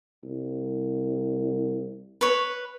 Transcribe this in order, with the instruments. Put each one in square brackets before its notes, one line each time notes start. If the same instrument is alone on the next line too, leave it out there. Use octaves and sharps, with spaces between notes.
[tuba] C2
[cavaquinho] B4 C#5